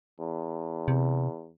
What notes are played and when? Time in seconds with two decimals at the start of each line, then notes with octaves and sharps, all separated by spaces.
0.20 E2
0.88 C3